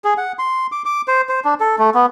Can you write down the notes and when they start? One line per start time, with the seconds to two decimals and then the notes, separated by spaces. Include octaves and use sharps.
0.04 G#4
0.18 F#5
0.39 C6
0.72 D6
0.85 D6
1.08 C5
1.29 C5
1.45 D4
1.60 A4
1.79 A3
1.95 B3